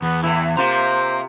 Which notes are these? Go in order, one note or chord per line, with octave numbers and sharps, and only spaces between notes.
E2 B3
A2 E3 E4
C3 F4 C5 F5 A#5